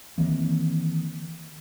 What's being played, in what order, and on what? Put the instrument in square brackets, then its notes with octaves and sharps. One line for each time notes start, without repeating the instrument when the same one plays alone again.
[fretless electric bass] D#3 E3 A#3 C4